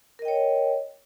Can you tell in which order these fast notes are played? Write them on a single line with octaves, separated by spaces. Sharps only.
A#4 D#5 G5 C#5